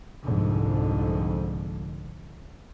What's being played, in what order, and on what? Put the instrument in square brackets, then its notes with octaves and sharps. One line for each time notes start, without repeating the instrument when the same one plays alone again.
[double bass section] C2 F2 G#2 D3